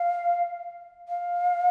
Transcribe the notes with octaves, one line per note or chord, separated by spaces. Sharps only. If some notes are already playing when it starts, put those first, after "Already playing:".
Already playing: F5
F5